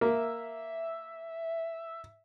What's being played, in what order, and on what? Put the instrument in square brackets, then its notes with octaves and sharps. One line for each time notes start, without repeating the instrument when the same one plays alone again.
[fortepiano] A#3 [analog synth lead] E5